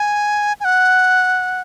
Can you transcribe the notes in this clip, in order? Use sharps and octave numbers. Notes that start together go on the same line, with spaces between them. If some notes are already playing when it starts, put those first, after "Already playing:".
Already playing: G#5
G#5
F#5